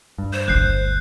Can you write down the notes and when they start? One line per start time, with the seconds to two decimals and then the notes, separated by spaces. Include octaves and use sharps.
0.18 G2
0.33 C5
0.48 G1 D2 F#6 G6 C7